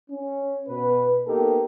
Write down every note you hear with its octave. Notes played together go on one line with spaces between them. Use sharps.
C#4
B2 B4
A#3 B3 D#4 G4 A4 A#4